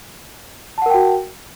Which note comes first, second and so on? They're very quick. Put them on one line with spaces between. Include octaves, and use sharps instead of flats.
A5 F#5 A#4 G5 F#4